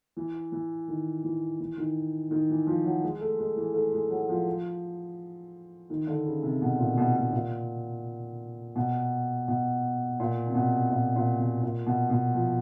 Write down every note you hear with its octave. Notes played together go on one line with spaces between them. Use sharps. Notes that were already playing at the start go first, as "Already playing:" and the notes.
E3
E3
D#3
E3
E3
D#3
D#3
E3
F3
F#3
G#3
A3
G#3
E3
A3
G#3
F#3
F3
D#3
D3
C#3
C3
B2
A#2
B2
B2
A#2
B2
B2
A#2
C3
B2
A#2
A#2
B2
A#2
B2
B2
F3